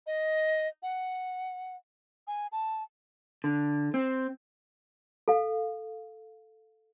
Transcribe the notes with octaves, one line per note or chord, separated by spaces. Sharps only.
D#5
F#5
G#5
A5
D3
C4
A4 F5